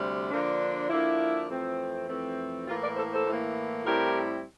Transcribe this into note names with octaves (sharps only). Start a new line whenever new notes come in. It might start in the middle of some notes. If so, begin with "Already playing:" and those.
Already playing: D2 C3 G3
D3 F3 A#3 D4
D3 F3 A#3 D4 E4
F2 E3 A3 C4
F2 E3 A3 C4
A2 E3 A#3 F4
A#4 D5
A4 C5
A4 C5
A2 E3 A#3
A2 G3 C4 E4 G4 A#4